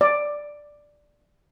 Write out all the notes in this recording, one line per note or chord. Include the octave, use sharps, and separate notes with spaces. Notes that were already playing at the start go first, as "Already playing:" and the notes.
D5